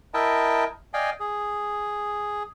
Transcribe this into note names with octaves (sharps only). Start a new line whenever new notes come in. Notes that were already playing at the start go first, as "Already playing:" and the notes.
E4 A#4 D#5 E5 G5 A5
D5 D#5 F5 G5 G#5
G#4